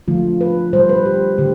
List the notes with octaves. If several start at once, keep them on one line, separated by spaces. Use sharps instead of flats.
D3 F3 A3 F4
B4
D3 G3 C5
B4
G4
D3 A3 G4